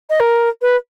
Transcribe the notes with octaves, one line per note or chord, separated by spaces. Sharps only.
D#5
A#4
B4